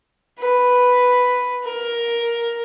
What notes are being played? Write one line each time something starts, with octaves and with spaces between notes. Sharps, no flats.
B4
A#4